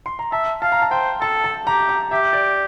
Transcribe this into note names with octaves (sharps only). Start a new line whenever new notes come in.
C6
A#5
E5 A5
F5 A5
A#5
A5
C5 G5
A4 A5
A5
G4 A#5
A#5
G4 E5
D5